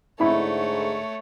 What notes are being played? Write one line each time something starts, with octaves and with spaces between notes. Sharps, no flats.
G#2 D3 A3 E4 C#5 B5